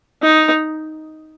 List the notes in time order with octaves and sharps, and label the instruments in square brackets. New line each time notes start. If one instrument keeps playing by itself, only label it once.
[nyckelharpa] D#4